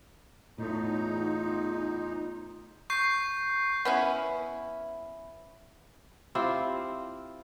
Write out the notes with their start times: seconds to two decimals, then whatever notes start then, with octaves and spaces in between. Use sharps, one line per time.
0.58 E2 A2 A3 D#4 F4
2.90 C#6 G6 C7
3.85 B3 C#4 E4
6.35 C4 E4 F4 G4